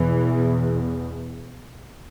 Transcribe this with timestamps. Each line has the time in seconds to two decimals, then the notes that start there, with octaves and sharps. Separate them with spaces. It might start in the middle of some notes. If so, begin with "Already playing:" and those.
Already playing: E2 B2 E3